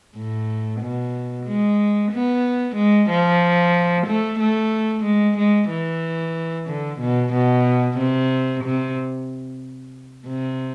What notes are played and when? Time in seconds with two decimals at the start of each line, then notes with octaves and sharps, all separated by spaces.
0.16 A2
0.81 B2
1.46 G#3
2.12 B3
2.76 G#3
3.10 F3
4.07 A3
4.40 A3
5.04 G#3
5.37 G#3
5.70 E3
6.68 D3
7.00 B2
7.33 B2
7.98 C3
8.64 C3
10.27 C3